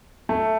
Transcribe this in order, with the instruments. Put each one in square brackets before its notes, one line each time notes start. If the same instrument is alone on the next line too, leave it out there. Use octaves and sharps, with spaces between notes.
[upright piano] A3